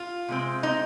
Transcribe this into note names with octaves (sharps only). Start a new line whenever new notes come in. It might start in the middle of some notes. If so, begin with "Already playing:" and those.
Already playing: F4
C3 G#3 C4
D#4